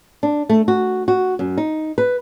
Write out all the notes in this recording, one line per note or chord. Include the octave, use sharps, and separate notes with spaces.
D4
A3
F#4
F#4
F#2
D#4
B4